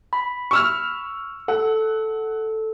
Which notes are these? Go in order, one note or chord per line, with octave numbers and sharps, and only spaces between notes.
B5
C#6 E6 F6
A4 F#5